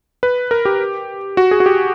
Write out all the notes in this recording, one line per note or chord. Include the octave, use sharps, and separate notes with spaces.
B4
A#4
G4
F#4
G#4
F#4
G4